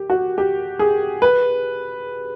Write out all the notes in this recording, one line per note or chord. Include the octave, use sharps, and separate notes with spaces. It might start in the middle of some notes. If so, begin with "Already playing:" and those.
Already playing: G4
F#4
G4
G#4
B4